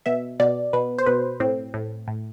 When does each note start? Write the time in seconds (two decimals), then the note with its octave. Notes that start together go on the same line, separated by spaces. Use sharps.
0.06 B2 E5
0.40 B2 D5
0.73 B2 B4
0.98 C5
1.06 B2 B4
1.40 A2 C4
1.74 A2
2.08 A2